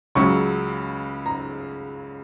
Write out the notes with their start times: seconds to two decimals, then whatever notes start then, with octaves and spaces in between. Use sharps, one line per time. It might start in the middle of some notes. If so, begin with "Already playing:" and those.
0.15 C#2 C#3 F#3 C#6
1.26 A#5